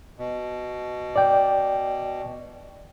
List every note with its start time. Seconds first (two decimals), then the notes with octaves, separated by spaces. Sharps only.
0.19 B2
1.16 D5 G5